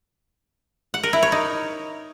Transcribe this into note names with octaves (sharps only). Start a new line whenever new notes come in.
F#5
A#4
E4
C#5
D#4